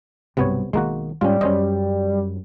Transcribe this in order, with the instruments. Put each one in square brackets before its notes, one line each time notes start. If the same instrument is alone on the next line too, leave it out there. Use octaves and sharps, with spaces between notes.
[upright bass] B1 G2 [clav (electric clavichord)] C3 B3 C#5
[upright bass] B1 D#3 [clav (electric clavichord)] G#3 A#3 F#4
[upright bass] G#2 [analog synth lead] G3 [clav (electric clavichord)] C#4 F4
[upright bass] F#2 [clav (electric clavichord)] C#4 C5 D#5